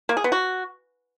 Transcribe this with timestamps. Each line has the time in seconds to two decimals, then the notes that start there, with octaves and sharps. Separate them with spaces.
0.09 A#3
0.17 G#4
0.24 B3
0.32 F#4